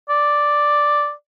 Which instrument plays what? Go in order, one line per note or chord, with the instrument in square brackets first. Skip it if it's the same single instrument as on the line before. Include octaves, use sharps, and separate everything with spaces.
[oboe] D5